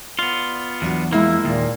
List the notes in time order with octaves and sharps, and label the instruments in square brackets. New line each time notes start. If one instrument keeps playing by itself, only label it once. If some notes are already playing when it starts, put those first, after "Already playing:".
[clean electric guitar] B3 F4 [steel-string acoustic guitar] D5
[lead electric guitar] E2 [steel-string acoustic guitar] F#3 D4 F#4
[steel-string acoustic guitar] F3 G#3 [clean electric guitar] A#3 [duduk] E4
[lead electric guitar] D#2 [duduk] A#2